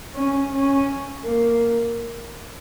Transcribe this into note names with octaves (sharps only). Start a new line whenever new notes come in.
C#4
C#4
A#3